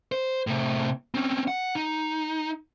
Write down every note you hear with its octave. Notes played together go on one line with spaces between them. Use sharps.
C5
A2 C3
C4 C#4
F#5
D#4